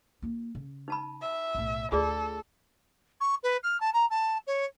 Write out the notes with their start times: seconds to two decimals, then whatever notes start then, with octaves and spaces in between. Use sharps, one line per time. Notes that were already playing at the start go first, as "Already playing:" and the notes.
0.22 A#3 F4
0.55 C#3
0.88 D#4 A5 B5
1.22 E5
1.55 B1 A2
1.92 D2 F4 G#4 A4 D5
3.21 C#6
3.43 B4
3.63 F6
3.81 A5
3.93 A#5
4.10 A5
4.47 C#5